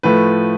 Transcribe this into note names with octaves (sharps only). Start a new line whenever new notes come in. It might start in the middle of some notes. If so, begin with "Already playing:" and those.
A2 F3 A3 B4